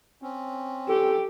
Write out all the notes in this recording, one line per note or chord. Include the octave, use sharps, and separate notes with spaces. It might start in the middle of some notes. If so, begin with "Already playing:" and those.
C4 C#4
G4 A4